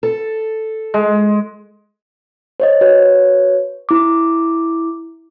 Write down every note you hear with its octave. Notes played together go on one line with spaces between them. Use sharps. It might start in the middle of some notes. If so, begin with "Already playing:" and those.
A4
G#3
C5 C#5 D#5
F#4 B4 C#5
E4 D6